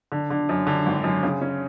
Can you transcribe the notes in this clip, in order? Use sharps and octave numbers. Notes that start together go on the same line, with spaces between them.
D3
D3
F#2
D3
G#1
F#2
C#3
C#4